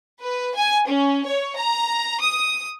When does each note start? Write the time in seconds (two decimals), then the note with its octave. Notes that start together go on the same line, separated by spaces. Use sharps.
0.21 B4
0.55 G#5
0.87 C#4
1.26 C#5
1.57 A#5
2.20 D#6